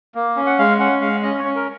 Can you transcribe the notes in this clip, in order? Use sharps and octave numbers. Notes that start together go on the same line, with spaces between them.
A#3
C#4
F#5
G#3 F5
C#4 F#5
G#3 F5
C#4 D#5
C#5
C#4
A#4